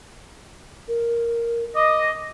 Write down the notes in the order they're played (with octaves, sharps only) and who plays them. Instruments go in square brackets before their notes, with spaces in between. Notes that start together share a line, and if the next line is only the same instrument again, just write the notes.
[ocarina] A#4
[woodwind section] D#5 [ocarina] D6